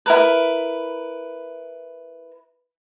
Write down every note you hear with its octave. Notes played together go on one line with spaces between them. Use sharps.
E4 A#4 B4